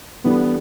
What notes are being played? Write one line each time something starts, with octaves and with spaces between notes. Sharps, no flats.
E3 G3 B3 D4 A4